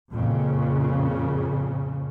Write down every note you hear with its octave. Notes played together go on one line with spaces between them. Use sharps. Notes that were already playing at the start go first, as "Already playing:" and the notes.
F2 A#2 C#3